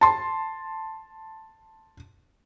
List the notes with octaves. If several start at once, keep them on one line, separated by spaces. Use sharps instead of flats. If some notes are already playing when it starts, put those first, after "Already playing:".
A5 C6